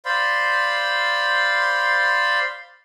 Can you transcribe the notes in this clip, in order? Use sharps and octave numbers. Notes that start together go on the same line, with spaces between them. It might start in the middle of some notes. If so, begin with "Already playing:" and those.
C5 D5 F5 B5 C6